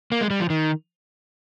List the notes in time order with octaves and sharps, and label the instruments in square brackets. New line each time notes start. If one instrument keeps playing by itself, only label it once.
[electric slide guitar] A#3
G#3
G3
F3
D#3